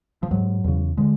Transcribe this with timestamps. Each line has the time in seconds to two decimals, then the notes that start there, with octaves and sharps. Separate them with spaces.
0.23 F3
0.31 G#2 F#3
0.64 E2 C#3
0.97 D3 G#3